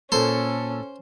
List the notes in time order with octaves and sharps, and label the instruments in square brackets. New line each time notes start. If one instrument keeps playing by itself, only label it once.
[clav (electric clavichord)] A#2 A#3 [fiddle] C#4 [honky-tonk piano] A4 [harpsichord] C5